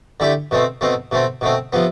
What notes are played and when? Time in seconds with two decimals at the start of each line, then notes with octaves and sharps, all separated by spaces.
0.20 D3 A3 E4 G4
0.51 B2 A3 C4
0.81 B2 A3 C4
1.11 B2 A3 C4
1.41 B2 A3 C4
1.73 C3 F3 B3